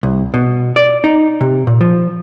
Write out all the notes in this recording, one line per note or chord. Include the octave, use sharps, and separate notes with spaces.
C2
B2
D5
D#4
C3
A#2
F3